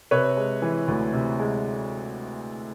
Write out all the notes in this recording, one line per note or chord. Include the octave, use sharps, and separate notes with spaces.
C3 B4 C#5
G#3
E3
D2
C3
G#3